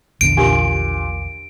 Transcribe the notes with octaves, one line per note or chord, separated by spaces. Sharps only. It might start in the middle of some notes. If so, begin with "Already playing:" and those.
A#1 E2 D3 D7
A#2 D4 G4